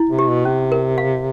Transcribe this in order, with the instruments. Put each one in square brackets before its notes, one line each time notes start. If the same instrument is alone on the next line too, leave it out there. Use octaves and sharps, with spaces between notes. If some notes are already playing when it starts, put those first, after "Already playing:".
Already playing: [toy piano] E4
[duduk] C3
[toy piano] G4
[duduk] B2
[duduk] C3 [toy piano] C#4
[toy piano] A#4
F5